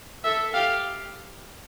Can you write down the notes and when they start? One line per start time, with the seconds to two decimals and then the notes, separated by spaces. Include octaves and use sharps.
0.24 A4 E5
0.54 G4 F5